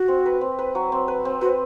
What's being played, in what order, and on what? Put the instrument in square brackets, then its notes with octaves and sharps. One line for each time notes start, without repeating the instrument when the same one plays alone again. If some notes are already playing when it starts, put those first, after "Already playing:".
Already playing: [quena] F#4
[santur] C4
B4
C4
B4
F#3
C4
B4
C4
[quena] F#4 [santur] B4